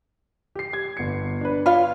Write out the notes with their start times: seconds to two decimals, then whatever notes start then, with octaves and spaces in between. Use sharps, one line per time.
0.55 G4 C7
0.73 G#6
0.97 G1 C#7
1.41 D4 B4
1.66 F4 C#5 F5 B5